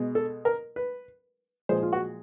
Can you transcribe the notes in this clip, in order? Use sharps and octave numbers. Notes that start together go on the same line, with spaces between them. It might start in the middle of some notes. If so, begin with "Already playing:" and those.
Already playing: B2 G#3
A4
A#4
B4
A#2 F3 G#3 C5
F4
F#4